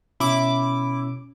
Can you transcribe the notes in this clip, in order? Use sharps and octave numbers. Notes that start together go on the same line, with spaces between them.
B2 C#4 E4 D6